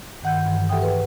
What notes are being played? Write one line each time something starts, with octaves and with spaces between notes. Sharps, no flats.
G2 D#3 F#5 F#6 G6
G2 E3
G4 A4 E5 F#5 G5 D#6
G#4 B4